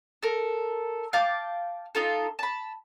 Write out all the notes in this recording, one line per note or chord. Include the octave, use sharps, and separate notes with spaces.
A4 A#4
F5 G5 A5 D6
D#4 F4 A4
A5 B5